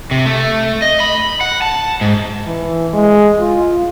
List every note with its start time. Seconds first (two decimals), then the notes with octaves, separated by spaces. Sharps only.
0.11 C3
0.26 A3
0.82 D#5
1.00 B5
1.41 F#5
1.62 A5
2.01 G#2
2.46 E3
2.94 G#3
3.40 F4